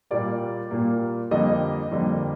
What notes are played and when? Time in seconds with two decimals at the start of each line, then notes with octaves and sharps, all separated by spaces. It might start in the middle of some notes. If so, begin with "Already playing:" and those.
0.11 A#2 G3 A#3 D5
0.71 A#2 G3 A#3
1.31 F2 D3 G3 A#3 D#5
1.91 F2 D3 G3 A#3